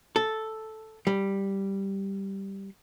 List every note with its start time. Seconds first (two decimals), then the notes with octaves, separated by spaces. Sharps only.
0.16 A4
1.07 G3